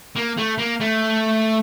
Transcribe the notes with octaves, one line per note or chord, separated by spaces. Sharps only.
A#3
A3
A#3
A3